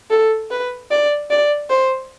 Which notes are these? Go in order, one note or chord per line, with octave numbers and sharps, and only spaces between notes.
A4
B4
D5
D5
C5